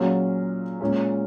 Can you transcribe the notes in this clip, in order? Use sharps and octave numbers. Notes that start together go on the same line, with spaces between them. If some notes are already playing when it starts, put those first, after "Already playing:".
Already playing: A#2 F#3 C#4 F4 G#4
A#2 G#3 C#4